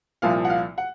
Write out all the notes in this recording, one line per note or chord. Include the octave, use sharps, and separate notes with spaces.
C2 A#2 F3 F5
F#5
F5
F#5